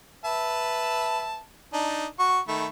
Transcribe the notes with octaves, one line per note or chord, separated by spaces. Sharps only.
B4 E5 A5
D4 D#4
F#4 C#6
D#3 A3 B5